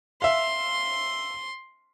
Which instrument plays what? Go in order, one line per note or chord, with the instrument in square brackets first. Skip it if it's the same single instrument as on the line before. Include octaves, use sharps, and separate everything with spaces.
[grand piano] E5 F5 [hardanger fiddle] C6